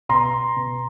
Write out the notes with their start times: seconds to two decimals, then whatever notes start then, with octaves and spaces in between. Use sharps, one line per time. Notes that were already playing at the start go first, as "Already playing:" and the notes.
0.09 B2 A#5 C6
0.57 B2